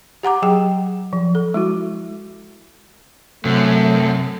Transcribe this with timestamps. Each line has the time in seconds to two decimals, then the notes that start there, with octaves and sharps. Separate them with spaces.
0.23 G4 F#5 A#5 D6
0.42 F#3 G#4 G5
1.13 F3
1.35 A4
1.54 G#3 E4 F#4
3.45 F#2 C3 A3 C4 C5